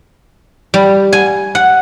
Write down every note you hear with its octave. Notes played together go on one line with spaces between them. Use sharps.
G3
G#5
F#5